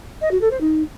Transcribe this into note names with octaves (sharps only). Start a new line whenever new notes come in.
D#5
F#4
A4
C5
D#4